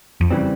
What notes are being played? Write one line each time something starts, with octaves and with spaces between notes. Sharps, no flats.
F2
C#3 E3 G3 C4